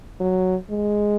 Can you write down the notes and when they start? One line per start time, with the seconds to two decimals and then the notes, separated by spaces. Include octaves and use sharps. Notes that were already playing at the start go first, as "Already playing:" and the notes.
0.20 F#3
0.70 G#3